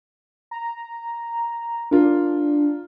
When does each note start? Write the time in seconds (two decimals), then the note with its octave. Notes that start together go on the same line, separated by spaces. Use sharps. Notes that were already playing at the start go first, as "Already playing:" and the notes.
0.51 A#5
1.91 D4 F4 A#4